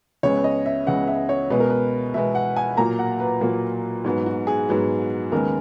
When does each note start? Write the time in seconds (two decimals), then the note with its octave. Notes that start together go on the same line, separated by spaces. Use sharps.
0.23 C#2 C#3 G#3 B3 C#5
0.44 D#5
0.66 E5
0.87 C#2 C#3 G#3 B3 F#5
1.08 E5
1.29 C#5
1.50 B2 G#3 B3 B4
1.60 A#4
1.70 B4
2.14 B2 G#3 B3 E5
2.35 F#5
2.56 G#5
2.77 A#2 F#3 A#3 A#5
2.99 F#5
3.20 B4
3.41 A#2 F#3 A#3
4.04 G#2 F#3 B3
4.26 F#4
4.47 G#4
4.69 G#2 F#3 B3
5.32 D#2 C#3 G#3 B3 A#4